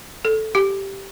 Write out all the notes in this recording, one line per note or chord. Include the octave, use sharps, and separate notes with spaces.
A4
G4